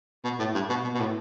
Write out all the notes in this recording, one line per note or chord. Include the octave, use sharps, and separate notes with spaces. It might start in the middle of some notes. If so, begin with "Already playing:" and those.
B2
A2
G2
B2
B2
B2
A2